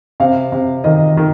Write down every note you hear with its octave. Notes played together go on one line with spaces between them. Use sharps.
C3 F5
C3
D#3 D#5
D#3